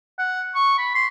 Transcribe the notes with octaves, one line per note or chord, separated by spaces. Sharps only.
F#5
C#6
B5
C6